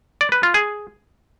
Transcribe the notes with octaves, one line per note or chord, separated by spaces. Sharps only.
D5
B4
F4
G#4